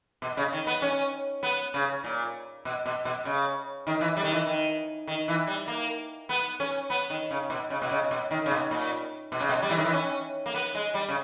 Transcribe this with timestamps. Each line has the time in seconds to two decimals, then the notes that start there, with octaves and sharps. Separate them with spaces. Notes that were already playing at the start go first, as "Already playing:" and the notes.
0.22 B2
0.37 C#3
0.53 D#3
0.67 B3
0.82 C#4
1.43 B3
1.74 C#3
2.04 A#2
2.65 B2
2.86 B2
3.05 B2
3.25 C#3
3.87 D#3
4.01 E3
4.17 G3
4.24 D#3
4.32 E3
4.47 D#3
5.08 D#3
5.28 E3
5.47 G3
5.68 A#3
6.29 B3
6.60 C#4
6.90 B3
7.10 D#3
7.31 C#3
7.50 B2
7.70 C#3
7.82 B2
7.91 C#3
8.11 B2
8.31 D#3
8.46 C#3
8.51 B2
8.71 A#2
9.32 B2
9.40 C#3
9.49 B2
9.62 G3
9.70 E3
9.77 D#3
9.85 E3
9.93 C#4
10.46 A#3
10.54 B3
10.75 G#3
10.94 G3
11.09 C#3